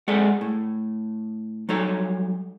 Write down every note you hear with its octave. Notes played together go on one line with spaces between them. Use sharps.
G#3 G#4 A4 D5 F#5
A2
F#3 G3 D#4 A4 C#5